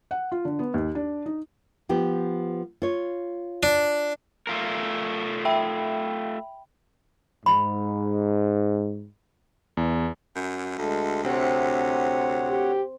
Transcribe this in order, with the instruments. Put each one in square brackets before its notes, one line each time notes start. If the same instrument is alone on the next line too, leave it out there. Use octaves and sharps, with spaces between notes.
[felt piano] F#5
F4
D3
B3
D#2
D4
D#4
[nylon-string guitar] F3 B3 G4
F4 C#5
[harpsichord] D4
[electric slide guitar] A3 F4 A#4
[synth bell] E5 G5 B5
[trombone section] G#2 [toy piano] B5
[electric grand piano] E2
[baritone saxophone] F#2
[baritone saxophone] D2 [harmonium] G#3 A4
[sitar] C3 [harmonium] C4 C#5 F#5
[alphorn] G4